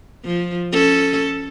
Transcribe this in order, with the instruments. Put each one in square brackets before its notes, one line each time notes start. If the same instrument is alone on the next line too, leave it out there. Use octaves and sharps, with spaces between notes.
[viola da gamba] F3
C#4 A4